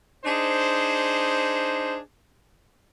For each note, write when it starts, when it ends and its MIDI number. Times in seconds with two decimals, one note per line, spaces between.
0.25 1.99 62
0.25 1.99 63
0.25 1.99 68
0.25 1.99 72